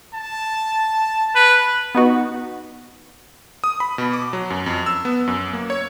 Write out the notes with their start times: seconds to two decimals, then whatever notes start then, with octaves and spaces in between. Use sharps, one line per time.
0.14 A5
1.35 B4
1.95 B3 D#4 F#4
3.64 D#6
3.80 B5
3.98 B2
4.13 D6
4.33 F#3
4.50 F#2
4.66 F2
4.86 E6
5.05 B3
5.27 F#2
5.53 A#3
5.70 C#5